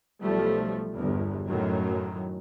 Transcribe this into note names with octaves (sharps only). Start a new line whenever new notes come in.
B1 F3 G3 A3
G1 E2
F#2 A2 D#3 F#3